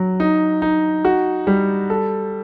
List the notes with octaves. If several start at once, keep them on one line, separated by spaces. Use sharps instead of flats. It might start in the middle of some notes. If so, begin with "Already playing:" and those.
Already playing: F#3
D#4
D#4
F#4
G3
A4